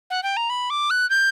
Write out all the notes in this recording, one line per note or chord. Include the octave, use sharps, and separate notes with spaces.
F#5
G5
A#5
B5
D6
F#6
G6